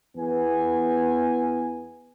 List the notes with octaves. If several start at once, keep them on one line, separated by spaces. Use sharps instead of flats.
E2 B3 G#5